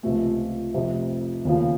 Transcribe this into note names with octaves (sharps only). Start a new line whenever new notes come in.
C#2 C3 F3 A3
F1 F2 C3
D#2 C#3 F3